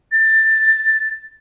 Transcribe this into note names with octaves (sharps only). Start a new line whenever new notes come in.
A6